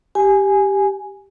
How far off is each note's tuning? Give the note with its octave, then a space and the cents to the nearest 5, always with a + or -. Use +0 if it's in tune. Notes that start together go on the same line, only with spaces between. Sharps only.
G4 +0 G#5 +0